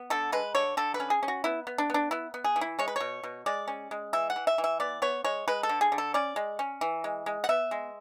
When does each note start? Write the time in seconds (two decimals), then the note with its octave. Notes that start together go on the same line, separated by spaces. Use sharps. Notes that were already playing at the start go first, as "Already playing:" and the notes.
Already playing: B3
0.10 D3 A4
0.32 G#3 B4
0.55 D3 C#5
0.77 D3 A4
0.94 B4
1.00 C#4
1.10 G#4
1.23 C#4
1.28 F#4
1.44 B3 E4
1.67 B3
1.78 D4
1.90 B3 D4
2.11 B3 E4
2.34 B3
2.44 G#4
2.56 E3
2.61 E4
2.79 G#3 C#5
2.88 B4
2.96 B2 C#5
3.23 B2
3.46 G#3 D5
3.68 C#4
3.91 G#3
4.13 E3 E5
4.30 F#5
4.36 E3
4.47 E5
4.58 E3
4.64 E5
4.80 B3 D5
5.02 B3 C#5
5.24 G#3 C#5
5.48 G#3 B4
5.63 A4
5.69 D3
5.81 G#4
5.92 D3
5.98 A4
6.14 C#4 D5
6.36 G#3
6.59 C#4
6.81 E3
7.04 G#3
7.26 G#3
7.44 F#5
7.49 B3 E5
7.71 G#3